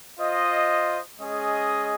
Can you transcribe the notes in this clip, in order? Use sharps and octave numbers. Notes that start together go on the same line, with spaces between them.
F4 C5 D#5
G#3 C#4 G#4 D#5